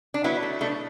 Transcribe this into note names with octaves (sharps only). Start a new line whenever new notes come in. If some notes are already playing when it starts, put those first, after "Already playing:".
D4
F#3 B3 E4
A3
B2 A3 D4